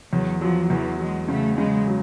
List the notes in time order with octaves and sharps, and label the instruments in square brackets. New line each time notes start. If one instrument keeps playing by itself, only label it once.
[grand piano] E2 [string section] F#3
[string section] F3 [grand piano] F#3
[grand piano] E2 [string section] E3
[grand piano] F#3 [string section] G#3
[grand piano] C#3 [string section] A3
[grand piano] C#3 [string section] G#3
[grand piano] F#3